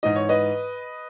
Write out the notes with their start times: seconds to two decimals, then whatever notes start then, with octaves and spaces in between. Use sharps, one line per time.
0.03 G#2 E3 D#5
0.16 C#5
0.29 B4 D#5